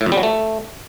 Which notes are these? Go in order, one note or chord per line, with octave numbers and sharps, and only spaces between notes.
A2
F2
G3
F#3
A3